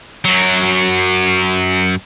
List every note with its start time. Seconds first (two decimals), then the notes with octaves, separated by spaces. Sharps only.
0.25 F#2 F#3